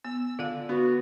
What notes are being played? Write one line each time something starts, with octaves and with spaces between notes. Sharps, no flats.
B3 E6
D3 F4 A4 F5
B3 F#4